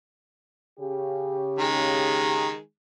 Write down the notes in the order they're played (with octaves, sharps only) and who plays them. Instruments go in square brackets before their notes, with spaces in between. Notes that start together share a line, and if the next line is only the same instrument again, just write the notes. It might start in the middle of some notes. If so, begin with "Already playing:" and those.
[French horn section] C#3 G4
[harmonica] D#3 G#3